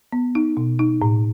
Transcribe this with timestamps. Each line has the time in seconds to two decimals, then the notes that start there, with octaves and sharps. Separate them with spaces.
0.12 B3
0.35 D#4
0.57 B2
0.79 D#4
1.02 A2